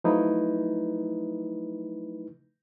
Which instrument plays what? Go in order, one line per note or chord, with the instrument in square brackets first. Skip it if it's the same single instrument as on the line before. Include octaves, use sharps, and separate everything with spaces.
[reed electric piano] F3 F#3 A3 D#4 E4 B4